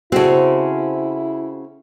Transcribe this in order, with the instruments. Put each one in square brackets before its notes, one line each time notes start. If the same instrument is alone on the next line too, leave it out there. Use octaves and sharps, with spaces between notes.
[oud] C#3 C4 [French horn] E4 [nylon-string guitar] F#4 A4